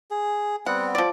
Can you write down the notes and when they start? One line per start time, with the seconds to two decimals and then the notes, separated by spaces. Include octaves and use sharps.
0.11 G#4
0.66 G3 B3 C4 F#5
0.95 F3 D5